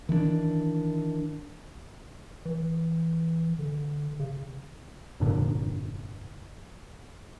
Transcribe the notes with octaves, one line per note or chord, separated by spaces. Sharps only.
D#3 E3 G3 D4
E3
D3
C#3
F1 G2 A#2 D3